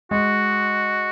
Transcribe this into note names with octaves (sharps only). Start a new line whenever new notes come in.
G#3 F#4